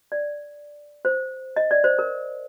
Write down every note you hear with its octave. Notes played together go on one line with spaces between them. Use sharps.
D5
C5
D#5
D5
C5
A#4